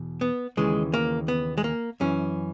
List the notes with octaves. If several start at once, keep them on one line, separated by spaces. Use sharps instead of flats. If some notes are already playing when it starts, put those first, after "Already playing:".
Already playing: E2 B2
B3
D#2 C#3 E3 G#3
A#3
B3
G#3
A#3
F#2 E3 C#4